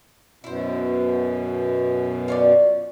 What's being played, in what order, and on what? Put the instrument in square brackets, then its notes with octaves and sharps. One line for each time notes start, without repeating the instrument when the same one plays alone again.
[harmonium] F#2 B2 [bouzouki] E4 C5
[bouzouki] F4 C#5 D5